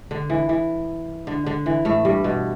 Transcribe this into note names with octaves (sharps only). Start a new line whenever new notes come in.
D3
E3
E3
D3
D3
E3
A2 A3
G2 G3
B2